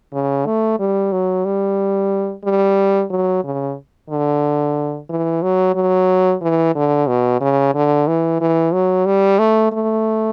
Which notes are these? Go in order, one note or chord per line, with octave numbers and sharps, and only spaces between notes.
C#3
A3
G3
F#3
G3
G3
F#3
C#3
D3
E3
F#3
F#3
E3
D3
B2
C#3
D3
E3
E3
F#3
G3
A3
A3